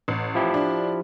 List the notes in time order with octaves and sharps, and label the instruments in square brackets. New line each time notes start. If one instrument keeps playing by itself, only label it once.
[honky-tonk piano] A1
[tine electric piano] F3 E4 G4
[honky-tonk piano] D4